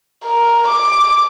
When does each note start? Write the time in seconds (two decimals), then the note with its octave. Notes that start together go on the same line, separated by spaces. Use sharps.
0.24 A#4
0.67 D6